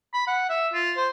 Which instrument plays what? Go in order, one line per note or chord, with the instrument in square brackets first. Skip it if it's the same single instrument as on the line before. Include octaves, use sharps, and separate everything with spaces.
[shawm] B5
F#5
E5
F4
C5